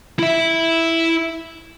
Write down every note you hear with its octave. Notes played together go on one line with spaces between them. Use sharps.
E4 E5